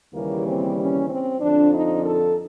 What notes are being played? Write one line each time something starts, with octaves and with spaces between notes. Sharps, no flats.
D#2 C#3 E3 G3 A#3
C4
C#4
C4
F2 D3 F3 D4
D#4
A4